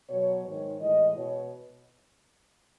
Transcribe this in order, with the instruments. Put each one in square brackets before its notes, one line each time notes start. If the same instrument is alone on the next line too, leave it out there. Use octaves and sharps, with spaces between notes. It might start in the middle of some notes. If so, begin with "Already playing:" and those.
[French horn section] B2 F#3 C#5
G#2 D#3 G#3 C#5
A2 E3 G#3 D#5
B2 C#5